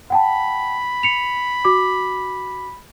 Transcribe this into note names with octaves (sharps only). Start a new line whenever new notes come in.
F#5 G5 A5 B5
C#7 F7
F#4 D6